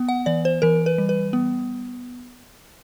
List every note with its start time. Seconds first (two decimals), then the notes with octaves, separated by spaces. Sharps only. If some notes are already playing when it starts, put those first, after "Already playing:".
Already playing: B3
0.09 F#5
0.26 E3 D5
0.45 C5
0.62 E3 A#4
0.86 B4
0.98 G3
1.09 B4
1.33 B3